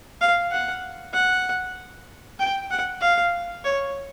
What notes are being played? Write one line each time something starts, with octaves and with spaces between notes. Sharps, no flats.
F5
F#5
F#5
G5
F#5
F5
C#5